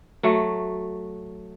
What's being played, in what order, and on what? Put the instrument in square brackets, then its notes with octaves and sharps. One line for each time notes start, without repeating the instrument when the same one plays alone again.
[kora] F#3 A3